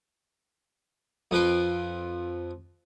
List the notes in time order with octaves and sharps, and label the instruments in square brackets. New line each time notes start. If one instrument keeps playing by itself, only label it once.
[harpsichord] F2 F3 B4 G5 C6